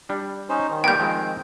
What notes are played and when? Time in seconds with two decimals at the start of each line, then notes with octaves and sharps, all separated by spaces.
0.09 G3 D4
0.49 C#4 D#4 C5
0.70 D#3
0.84 G3 A#3 B3 G5 G6
1.00 F3 G#3 C4